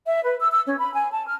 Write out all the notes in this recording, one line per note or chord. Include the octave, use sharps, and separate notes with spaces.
E5
B4
E6
E6
C#4
B5
G#5
A5
F6